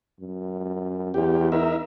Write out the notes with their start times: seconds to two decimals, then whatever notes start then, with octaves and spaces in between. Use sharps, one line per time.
0.20 F#2
1.14 E2 G4
1.52 D#4 A#4 E5